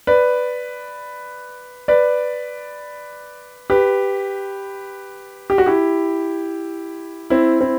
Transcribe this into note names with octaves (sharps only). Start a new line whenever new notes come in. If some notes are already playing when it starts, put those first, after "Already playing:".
B4 D5
B4 D5
G4 B4
G4
F#4
E4 G4
C4 E4
C4 E4